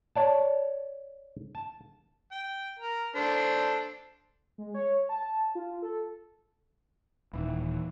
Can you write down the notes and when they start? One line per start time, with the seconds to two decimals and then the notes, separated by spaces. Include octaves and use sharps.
0.16 C#5 D5 A5
1.55 A5
2.32 G5
2.79 A#4
3.16 D4 A4 C5
4.58 G#3
4.74 C#5
5.09 A5
5.55 F4
5.82 A4
7.33 D#1 E3